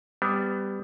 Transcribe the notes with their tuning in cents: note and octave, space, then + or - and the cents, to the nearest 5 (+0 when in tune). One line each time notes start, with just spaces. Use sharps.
G3 +5 B3 +25